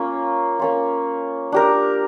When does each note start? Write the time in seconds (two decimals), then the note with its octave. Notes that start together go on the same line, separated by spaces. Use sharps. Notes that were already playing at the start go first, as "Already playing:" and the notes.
Already playing: A#3 C#4 F4
0.59 A#3 C#4 F4
1.52 D4 G4 A#4